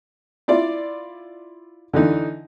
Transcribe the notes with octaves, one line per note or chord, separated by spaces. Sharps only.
E4 F4 D5
D3 E3 D#4